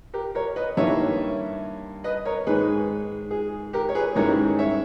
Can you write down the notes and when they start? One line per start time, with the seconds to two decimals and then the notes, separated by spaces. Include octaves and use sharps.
0.14 G4 A#4
0.35 A#4 C#5
0.56 B4 D#5
0.77 G2 D#3 A#3 E4 C#5 E5
2.04 B4 D#5
2.25 A#4 C#5
2.47 G#2 D#3 G#3 G#4 B4
3.31 G#4
3.73 G4 A#4
3.89 C#5
3.95 G#4 B4
4.15 G#2 D#3 G3 C#4 E4 A#4 C#5
4.59 C#5 E5